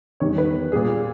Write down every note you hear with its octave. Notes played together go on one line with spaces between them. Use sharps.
E2 D#3 G3 C#5
B4
A#2 G3 G#4